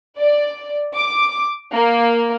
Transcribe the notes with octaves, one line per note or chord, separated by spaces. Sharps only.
D5
D6
A#3